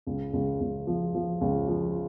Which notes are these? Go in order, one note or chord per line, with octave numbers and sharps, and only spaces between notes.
C#2
C#2
C#2
F3
F3
C#2
F3